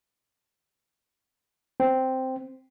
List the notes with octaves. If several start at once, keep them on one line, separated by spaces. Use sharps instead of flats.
C4